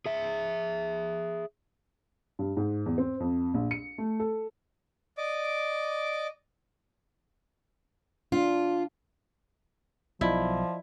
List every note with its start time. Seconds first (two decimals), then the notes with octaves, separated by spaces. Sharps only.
0.06 G#4 E5
2.39 G2
2.57 G#2
2.86 E2
2.98 C4
3.20 F2
3.54 A#1
3.71 C#7
3.98 A3
4.20 A4
5.17 D5 D#5 D6
8.32 D4 F4
10.21 B1 F3 E4 F4 D5 D#5